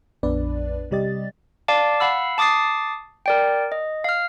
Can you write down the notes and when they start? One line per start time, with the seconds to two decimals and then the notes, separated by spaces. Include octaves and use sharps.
0.23 A#1 F2 B3 D4 B4 D5
0.91 C3 G3 G4 D5 D#5 A6
1.68 D5 F5 A5 D6
2.00 F5 F#5 B5 E6
2.38 A5 D6 D#6 A6 C7
3.26 A#4 D5 G5
3.72 D#5
4.04 F5 F6